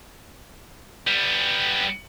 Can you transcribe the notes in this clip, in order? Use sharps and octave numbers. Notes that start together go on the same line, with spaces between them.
G3 B3